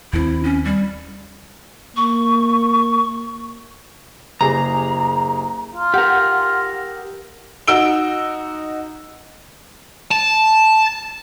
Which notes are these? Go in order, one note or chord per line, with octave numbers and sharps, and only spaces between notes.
D#2 G#3 C4 E4
C#4
G3
A#3 C#6
F#1 G4 G#4 A#5
F4
G4 A#4 F#5
D#4 F#4 E6 D7 G7
A5